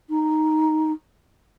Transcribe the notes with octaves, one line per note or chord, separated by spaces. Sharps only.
D#4